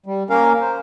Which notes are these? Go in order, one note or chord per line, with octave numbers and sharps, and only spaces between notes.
G3
A#3 C#4 A#4 F5
C5